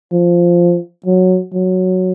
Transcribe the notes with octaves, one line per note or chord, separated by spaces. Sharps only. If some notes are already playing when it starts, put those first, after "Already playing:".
F3
F#3
F#3